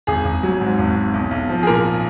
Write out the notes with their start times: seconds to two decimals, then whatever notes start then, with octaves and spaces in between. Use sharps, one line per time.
0.07 G#1 G#4
0.25 G#1
0.43 F#3
0.61 G#2
0.79 G#1
0.96 G#1
1.14 B1
1.31 B1
1.49 F3
1.63 G#4
1.67 A#2 A#4